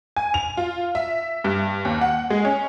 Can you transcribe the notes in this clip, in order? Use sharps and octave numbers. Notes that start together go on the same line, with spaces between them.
G#5
F7
F4
E5
G2
D#2
F#5
G#3
C#4